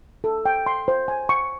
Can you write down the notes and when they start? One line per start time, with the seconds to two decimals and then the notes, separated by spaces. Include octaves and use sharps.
0.24 A4
0.46 G5
0.66 C6
0.88 C5
1.08 G#5
1.29 C#6